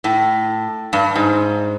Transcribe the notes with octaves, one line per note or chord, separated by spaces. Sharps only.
A2
G2
G#2